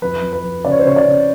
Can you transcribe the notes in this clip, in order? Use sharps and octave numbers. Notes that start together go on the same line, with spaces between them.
F2 B4
F2
B4
F2
C#3 D5
C#5
C5
C#3 C#5
D5
C#3